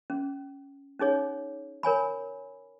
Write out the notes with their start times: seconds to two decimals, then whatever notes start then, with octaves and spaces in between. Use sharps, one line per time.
0.10 C#4
0.99 C#4 D#4 G#4 C#5
1.83 A#4 C#5 G#5 B5